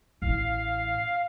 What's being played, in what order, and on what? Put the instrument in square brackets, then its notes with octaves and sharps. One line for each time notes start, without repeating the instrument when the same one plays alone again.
[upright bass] A1 E4 [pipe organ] F5